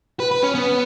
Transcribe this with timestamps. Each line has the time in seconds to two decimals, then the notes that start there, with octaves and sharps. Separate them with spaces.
0.20 B4
0.31 B4
0.43 C#4
0.55 B3